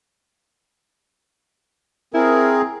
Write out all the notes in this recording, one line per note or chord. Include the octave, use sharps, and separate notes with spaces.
C4 E4 G#4 A#4